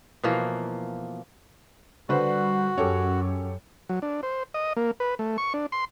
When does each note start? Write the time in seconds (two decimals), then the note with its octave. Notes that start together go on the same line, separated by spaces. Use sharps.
0.23 B2 E3 F3 A#3
2.09 D3 G3 F#4 B4 C5
2.78 F#2 C#4 G4 A4 C#5
3.89 F#3
4.02 D4
4.23 C5
4.54 D#5
4.77 A#3
5.00 B4
5.19 A3
5.38 C#6
5.54 D4
5.72 C6